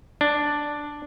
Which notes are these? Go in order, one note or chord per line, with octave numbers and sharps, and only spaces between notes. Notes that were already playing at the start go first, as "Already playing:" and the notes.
D4